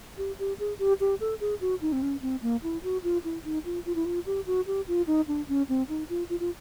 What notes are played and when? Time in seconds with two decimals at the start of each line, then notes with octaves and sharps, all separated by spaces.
0.18 G4
0.39 G4
0.59 G#4
0.79 G4
1.00 G4
1.20 A4
1.40 G#4
1.61 F#4
1.82 D#4
1.92 C4
2.02 C#4
2.22 C4
2.42 A#3
2.63 E4
2.83 F#4
3.04 F4
3.24 E4
3.44 D#4
3.65 F4
3.86 F4
3.95 E4
4.05 F4
4.26 G4
4.47 F#4
4.67 G4
4.88 F4
5.07 D#4
5.28 D4
5.48 C#4
5.69 C4
5.89 D#4
6.09 F4
6.30 F4
6.40 F4